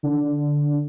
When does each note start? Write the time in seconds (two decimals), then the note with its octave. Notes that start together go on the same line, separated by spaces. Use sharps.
0.03 D3